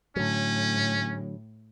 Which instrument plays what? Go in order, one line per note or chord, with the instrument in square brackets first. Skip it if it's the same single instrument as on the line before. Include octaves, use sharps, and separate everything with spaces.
[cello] A2 [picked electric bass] D3 F#3 [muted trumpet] C#4